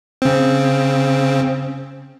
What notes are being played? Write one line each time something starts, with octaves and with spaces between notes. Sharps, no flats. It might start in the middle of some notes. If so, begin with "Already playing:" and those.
C#3 C4